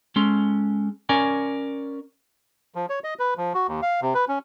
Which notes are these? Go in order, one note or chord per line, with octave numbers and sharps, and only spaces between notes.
G#3 C#4 A4 C6
C#4 A#4 D5 G#5
F3
C#5
D#5
B4
F3
F#4
D#2
F5
C3
B4
C#4